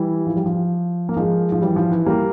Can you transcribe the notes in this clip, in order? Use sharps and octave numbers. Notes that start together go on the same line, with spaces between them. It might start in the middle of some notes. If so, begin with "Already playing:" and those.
Already playing: E3 G3
F3
G3
F3
A#3
F3 G#3
F3
E3 G3
F3
E3
G3 A#3